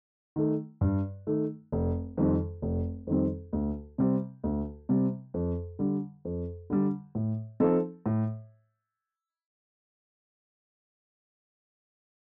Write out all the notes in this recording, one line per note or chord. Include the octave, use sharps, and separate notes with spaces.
D#3 A3
G2
D#3 A3
F1
F2 D#3 G3 C4
F1
F2 D#3 G3 C4
D2
C3 G3 C4
D2
C3 G3 C4
F2
D3 G3
F2
D3 G3
A2
F3 C4 D#4 A4
A2